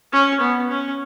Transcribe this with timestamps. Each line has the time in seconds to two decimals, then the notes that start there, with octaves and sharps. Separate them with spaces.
0.13 C#4
0.41 B3
0.70 C#4